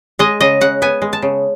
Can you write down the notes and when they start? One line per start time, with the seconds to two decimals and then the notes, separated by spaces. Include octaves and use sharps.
0.19 G#3 D#5
0.41 C#3 D#5
0.61 C#3 F#5
0.82 B3 G#5
1.02 G#3
1.13 A5
1.22 C#3